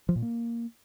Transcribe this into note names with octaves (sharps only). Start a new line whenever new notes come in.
F3
A#2
A#3